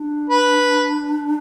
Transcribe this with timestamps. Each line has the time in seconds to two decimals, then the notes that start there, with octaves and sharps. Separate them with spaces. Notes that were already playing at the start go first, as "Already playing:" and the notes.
Already playing: D4
0.30 B4